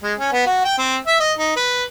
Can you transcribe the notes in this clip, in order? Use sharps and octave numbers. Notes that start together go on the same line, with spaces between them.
G#3
C#4
B3
F#4
G5
C4
E5
D#5
D#4
B4